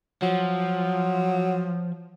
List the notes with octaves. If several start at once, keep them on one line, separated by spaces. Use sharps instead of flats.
F3 F#3